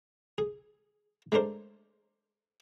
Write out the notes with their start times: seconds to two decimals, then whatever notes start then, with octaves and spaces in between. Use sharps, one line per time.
0.38 G#4
1.32 G#3 A3 D4 A#4 C5